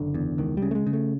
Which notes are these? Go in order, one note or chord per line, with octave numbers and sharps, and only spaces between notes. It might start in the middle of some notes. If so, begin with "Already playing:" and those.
Already playing: F#1 D3
E2
C#2 D#3
C#3 G3
A3
G#3
C#3
A3